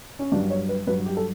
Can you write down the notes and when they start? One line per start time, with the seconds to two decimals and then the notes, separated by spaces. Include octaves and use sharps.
0.19 C#4
0.32 G2 F#3 D4
0.50 C#5
0.69 B4
0.87 G2 F#3 B4
1.06 G4
1.17 A4